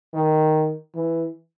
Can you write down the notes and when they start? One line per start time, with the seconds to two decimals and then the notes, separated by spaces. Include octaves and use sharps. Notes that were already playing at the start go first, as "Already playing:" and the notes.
0.13 D#3
0.95 E3